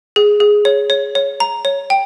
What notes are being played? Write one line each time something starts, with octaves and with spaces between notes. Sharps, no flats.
G#4
G#4
C#5
C#5
C#5
A#5
C#5
G5